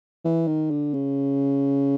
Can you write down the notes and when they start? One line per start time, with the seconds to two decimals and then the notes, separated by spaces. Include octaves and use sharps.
0.25 E3
0.47 D#3
0.70 D3
0.93 C#3